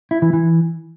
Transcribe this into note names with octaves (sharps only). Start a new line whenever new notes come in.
E4
E3
E3